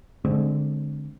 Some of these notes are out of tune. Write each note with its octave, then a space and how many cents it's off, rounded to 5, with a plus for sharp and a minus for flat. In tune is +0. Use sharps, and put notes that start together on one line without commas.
D3 +0 G#3 +30 C4 +0